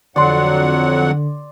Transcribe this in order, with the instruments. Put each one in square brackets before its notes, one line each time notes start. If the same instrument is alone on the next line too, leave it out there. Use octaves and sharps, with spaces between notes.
[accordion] F2 F#3 F#5 [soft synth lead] D3 [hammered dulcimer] D5 C6